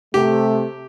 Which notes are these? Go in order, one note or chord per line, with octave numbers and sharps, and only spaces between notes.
C3 A3 G4